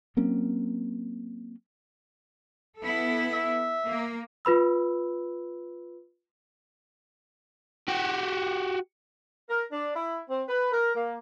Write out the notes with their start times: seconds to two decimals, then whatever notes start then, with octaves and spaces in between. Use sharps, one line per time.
0.17 F#3 A#3 C4 C#4
2.81 B3 E4 A4
3.33 E5
3.88 A#3
4.45 F4 B4 B5 E6
7.88 F#4 G4
9.50 A#4
9.72 D4
9.95 E4
10.29 C4
10.48 B4
10.72 A#4
10.95 A#3